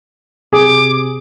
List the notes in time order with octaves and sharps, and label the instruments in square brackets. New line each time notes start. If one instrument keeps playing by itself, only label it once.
[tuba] C3 [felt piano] G#4 [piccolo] D6